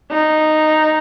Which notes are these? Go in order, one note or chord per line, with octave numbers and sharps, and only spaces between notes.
D#4